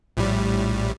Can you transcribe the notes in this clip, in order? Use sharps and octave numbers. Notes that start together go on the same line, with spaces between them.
A#1 A2 G3